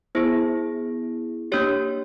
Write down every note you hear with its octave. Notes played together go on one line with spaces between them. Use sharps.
B3 E4 G#4 C5
A#3 D4 G4 C#5